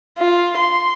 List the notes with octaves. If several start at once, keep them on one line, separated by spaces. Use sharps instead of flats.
F4
C6